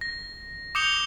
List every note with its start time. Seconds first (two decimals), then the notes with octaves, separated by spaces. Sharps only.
0.01 A#6
0.75 D6 D#6 G6 C#7 F7 G7